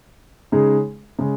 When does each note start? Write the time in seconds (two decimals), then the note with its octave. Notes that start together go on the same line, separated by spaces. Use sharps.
0.52 C#3 G#3 D#4 G#4
1.19 C#3 G#3